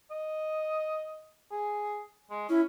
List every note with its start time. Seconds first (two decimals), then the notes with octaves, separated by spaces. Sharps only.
0.11 D#5
1.52 G#4
2.31 G#3
2.49 C#4 E4